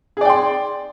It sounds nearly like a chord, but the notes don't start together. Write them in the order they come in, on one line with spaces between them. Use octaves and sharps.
G#4 D5 G5 C6